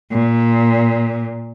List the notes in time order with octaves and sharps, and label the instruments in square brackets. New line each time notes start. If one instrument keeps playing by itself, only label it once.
[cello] A#2